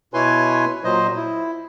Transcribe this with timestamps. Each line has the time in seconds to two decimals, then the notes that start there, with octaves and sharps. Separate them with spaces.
0.14 B2 E4 B4 C#5 G#5 C6
0.84 A#2 F#3 C5 D#5
1.16 E4